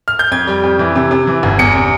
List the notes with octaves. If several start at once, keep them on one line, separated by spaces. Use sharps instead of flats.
F6
G6
F2 G#6
G3
F2
E3
C3
C3
E3
G1
E2 C#7
C3